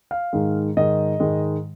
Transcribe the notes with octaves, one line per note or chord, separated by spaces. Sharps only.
F5
G#2 D#3 G#3
G#2 D#3 G#3 D#5
G#2 D#3 G#3